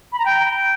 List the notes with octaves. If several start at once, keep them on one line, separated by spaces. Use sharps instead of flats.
B5
A#5
G5